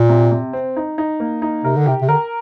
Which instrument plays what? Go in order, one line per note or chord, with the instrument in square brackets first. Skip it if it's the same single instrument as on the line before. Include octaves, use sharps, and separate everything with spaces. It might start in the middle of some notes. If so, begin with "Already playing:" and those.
Already playing: [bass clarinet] A#2
[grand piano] C3
C3
C4
D#4
D#4
A#3
D#4
[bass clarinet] C3 [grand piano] A#4
[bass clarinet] D3
[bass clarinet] C3 [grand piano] G4
[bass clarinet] C3
[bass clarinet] D3 [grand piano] A#4